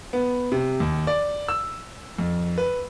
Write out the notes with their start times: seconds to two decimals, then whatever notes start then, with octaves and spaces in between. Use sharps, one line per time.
0.13 B3
0.52 C3
0.80 D#2
1.07 D5
1.48 E6
2.19 F2
2.58 B4